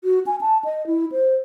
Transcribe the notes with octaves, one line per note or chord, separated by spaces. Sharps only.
F#4
G#5
A5
D#5
E4
C5